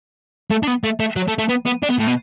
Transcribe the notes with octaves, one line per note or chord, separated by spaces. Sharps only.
A3
D4
B3
A3
A3
F#3
A3
A3
B3
B3
D4
B3
A2
B2